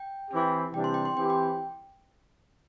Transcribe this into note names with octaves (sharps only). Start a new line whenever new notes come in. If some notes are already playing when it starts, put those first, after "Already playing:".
Already playing: G5
E3 C4 G4
C3 E3 G3 D4 G4 G5
C6
G5
C6
E3 C4 G4 G5
G5